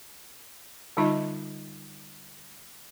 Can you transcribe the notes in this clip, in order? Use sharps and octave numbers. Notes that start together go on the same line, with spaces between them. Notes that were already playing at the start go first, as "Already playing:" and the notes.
D3 G3 D#4 F4 D#5 E5